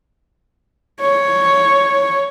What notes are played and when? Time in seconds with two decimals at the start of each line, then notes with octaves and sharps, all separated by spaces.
1.01 C#5